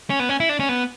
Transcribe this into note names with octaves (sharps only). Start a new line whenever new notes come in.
C#4
B3
C#4
E4
D4
C#4
B3